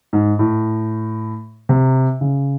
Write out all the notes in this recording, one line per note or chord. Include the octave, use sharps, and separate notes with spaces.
G#2
A2
C3
C#3